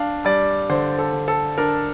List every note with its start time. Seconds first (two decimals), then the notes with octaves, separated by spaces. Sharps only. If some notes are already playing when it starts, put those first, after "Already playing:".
Already playing: D4 F5
0.25 G3 D5
0.69 D3 C5
0.99 A4
1.13 D3
1.28 A4
1.58 D4 A#4